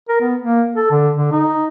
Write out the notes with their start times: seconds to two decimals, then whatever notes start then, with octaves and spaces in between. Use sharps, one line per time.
0.09 A#4
0.21 B3
0.42 A#3
0.76 A4
0.91 D3
1.17 D3
1.32 D#4